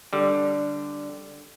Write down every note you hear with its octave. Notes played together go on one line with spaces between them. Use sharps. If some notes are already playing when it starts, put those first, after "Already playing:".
D3 G3